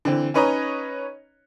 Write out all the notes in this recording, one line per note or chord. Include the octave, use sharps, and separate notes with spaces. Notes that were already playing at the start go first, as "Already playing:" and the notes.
D3 E3 C4
C#4 D#4 B4 C#5 D#5 A#5